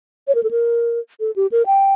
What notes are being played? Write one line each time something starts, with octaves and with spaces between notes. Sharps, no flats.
C#5
A#4
A4
A#4
A4
G4
A#4
G5